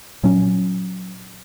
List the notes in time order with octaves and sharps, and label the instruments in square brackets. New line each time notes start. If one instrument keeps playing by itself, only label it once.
[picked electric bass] A#2 F#3 C#4